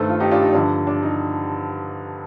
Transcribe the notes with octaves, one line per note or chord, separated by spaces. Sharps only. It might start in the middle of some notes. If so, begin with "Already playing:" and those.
Already playing: G2 D#3 A3 A4 C5
F4
D#4 G4
D4 F4
D#4
G2 D3 F3 D4
D4
D#4